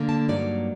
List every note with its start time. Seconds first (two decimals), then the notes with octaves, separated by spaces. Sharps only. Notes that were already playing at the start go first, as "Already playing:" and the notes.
Already playing: D3 A#3
0.09 A5
0.28 G2 F#3 A#3 D#4 D5